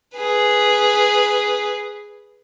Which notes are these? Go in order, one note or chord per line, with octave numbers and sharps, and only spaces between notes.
G#4 B4